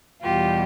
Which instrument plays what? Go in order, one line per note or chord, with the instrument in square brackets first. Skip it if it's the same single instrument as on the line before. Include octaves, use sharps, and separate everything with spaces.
[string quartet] E2 B2 G3 F4 G4